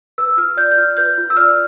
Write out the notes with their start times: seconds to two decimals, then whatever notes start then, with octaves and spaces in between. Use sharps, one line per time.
0.18 B4 E6
0.37 F4 F6
0.57 D5 G6
0.71 G6
0.77 F4 F6
0.97 B4 G6
1.18 F4
1.30 E6
1.36 D5 F6